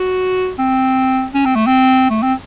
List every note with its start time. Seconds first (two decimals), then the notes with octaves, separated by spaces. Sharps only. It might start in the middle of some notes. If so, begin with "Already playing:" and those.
Already playing: F#4
0.59 C4
1.34 C#4
1.45 C4
1.55 A3
1.67 C4
2.10 A3
2.22 C4